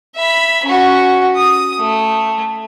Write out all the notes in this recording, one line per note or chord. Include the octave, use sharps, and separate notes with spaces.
E5 B5
C#4 F#4
D#6
A3